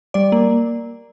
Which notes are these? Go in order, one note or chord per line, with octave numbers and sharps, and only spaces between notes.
G3 D5
A#3